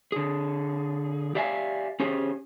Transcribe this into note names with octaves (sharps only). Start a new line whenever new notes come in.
D3 G#4
G4 D5 E5 F5 G#5
C#4 G4 G#4 C5